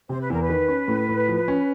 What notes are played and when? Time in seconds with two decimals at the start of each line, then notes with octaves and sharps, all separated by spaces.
0.09 C3 C5
0.20 B4
0.30 E2 A#4
0.42 B4
0.49 D#3
0.68 C#4
0.88 A2
1.09 A2
1.28 F3
1.48 C#4